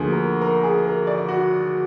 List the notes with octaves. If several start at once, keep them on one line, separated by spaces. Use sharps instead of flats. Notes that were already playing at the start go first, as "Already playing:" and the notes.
Already playing: D2 D3 F3 A#3 G#4
A#4
A#4
G#4
A#4
D5
F#4